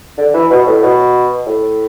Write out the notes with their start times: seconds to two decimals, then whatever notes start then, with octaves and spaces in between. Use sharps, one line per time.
0.17 D3
0.34 E3
0.50 B2
0.66 A2
0.83 B2
1.46 A2